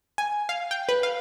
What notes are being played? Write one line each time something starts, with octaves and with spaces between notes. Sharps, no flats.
G#5
F5
G5
B4
F5